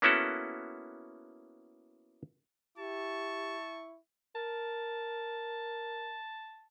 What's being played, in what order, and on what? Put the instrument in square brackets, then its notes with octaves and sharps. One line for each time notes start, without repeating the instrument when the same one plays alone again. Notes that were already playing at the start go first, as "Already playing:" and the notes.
[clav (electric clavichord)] A#3 B3 C#4 E4 F#4 A4
[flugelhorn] E4 [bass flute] G4 [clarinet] A5 [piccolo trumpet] C#6
[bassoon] A#4 [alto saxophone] A5